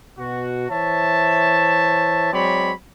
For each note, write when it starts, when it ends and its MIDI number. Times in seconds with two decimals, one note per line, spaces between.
0.19 0.66 47
0.19 0.66 66
0.71 2.33 52
0.71 2.33 72
0.71 2.33 73
0.71 2.33 76
0.71 2.33 81
2.33 2.73 54
2.33 2.73 56
2.33 2.73 60
2.33 2.73 73
2.33 2.73 74
2.33 2.73 83